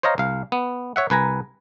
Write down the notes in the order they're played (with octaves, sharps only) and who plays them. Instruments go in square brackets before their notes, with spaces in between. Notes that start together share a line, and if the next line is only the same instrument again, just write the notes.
[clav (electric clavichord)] C5 C#5 D#5 F5 A#5
C2 F5
B3
C#5 E5 F#5
C2 B4 G#5 A#5